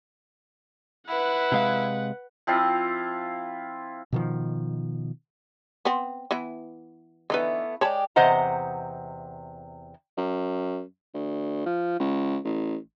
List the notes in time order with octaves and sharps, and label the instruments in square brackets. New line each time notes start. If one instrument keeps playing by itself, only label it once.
[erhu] E4 [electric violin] B4 F#5
[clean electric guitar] C3 G#3 F5
[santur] F3 C4 E4 F4
[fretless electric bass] B2 D#3 F3
[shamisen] B3 C4
E3 B3 E4
[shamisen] D3 D#4 B4 [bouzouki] E3 A3 B3
[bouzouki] G#3 G4 D5 [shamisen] C#5 A5 B5
[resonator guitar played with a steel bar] E2 C3 C5 D#5 F#5 A#5
[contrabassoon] F#2
D2
F3
C#2
A1